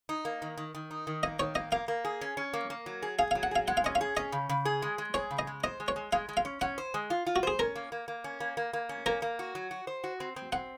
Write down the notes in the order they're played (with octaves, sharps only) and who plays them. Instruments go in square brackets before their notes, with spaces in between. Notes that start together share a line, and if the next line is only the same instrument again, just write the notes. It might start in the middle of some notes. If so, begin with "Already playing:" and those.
[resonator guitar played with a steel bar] D#4
A#3
D#3
D#3
D#3
D#4
D#3
[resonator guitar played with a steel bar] A#3 [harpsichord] D#5
[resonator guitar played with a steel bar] D#3 [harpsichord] C#5
[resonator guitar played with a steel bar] A#3 [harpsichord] D#5
[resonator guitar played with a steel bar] A#3 [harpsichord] F5
[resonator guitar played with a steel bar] A#3
G#4
C#4
C#4
A#3
A#3
F#3
G#4
[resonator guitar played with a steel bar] G#4 [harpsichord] F5
[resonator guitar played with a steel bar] F#3 [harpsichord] F5
[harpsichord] F#5
[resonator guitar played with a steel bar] G#4 [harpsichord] F5
[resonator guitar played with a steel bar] G#3 [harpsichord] F#5
[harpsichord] F5
[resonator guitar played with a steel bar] C#4 [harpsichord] D#5
[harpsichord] F5
[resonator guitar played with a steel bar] G#4
[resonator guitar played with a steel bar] C#4 [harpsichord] D#5
[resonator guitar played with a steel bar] C#3
C#3
G#4
G#3
G#3
[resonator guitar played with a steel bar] G#4 [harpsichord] C#5
[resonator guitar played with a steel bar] C#3
[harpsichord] D#5
[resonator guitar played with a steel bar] G#3
[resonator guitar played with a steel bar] C5 [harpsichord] D#5
[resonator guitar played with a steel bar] G#3
[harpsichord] C#5
[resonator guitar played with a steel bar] G#3
[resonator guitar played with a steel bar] G#3 [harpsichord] F5
[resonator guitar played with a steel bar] G#3
[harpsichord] F5
[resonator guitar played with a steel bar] C#4
[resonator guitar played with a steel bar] C#4 [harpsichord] F#5
[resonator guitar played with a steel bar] C5
G#3
F4
F4
[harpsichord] F#4
[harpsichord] G#4 [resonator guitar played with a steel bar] C5
[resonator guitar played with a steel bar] C#4 [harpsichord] A#4
[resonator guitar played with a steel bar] A#3
A#3
A#3
C#4
A#3
A#3
A#3
C#4
[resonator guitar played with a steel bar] A#3 [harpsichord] A#4
[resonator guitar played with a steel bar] A#3
F#4
F#3
F#4
C5
F#4
C4
C4
[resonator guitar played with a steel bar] C4 [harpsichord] F#5